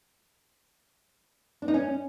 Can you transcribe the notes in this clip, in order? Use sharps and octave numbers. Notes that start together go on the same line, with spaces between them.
D4
D#4
C#4